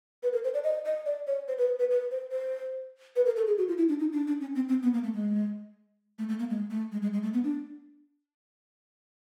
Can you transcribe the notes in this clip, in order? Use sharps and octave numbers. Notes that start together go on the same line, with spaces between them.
B4
A#4
C5
D5
D#5
D#5
D5
C#5
C5
B4
B4
B4
C5
C5
B4
A#4
A4
G#4
F#4
F4
E4
D4
D#4
D4
D4
C#4
C4
C4
B3
A#3
A3
G#3
A3
A3
A#3
G#3
A3
G#3
G#3
G#3
A3
B3
D4